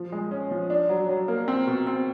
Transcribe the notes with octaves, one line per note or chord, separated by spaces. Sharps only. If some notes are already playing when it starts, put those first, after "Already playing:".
Already playing: F3
G#3
C#4
F3
D4
F#3
F#3
A#3
C4
B2
C4